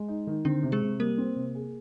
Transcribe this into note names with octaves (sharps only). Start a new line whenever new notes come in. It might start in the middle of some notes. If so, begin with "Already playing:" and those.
Already playing: G#3
D#4
D#3
D3 C4 D4
C3
G#3 G#4
C3
G3 A#3 A#4
C4
C3
G#4